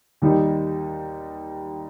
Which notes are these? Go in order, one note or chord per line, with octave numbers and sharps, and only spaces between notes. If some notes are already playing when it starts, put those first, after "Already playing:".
D#2 D#3 G3 D#4